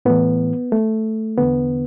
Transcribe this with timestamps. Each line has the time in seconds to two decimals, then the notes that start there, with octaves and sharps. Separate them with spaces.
0.05 A2 E3 B3
0.72 A3
1.38 E2 D3 B3